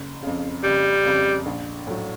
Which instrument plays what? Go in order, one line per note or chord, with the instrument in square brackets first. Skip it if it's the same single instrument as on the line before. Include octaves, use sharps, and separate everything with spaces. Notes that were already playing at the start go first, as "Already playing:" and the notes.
Already playing: [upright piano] F#1
F2 C#3
[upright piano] F#1 [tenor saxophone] G3
[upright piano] F2 C#3
A#1
A2 F#3